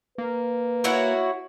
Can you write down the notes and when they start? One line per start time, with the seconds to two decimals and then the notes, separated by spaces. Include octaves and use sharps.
0.18 A#3 B4
0.84 E4 F#4 C#5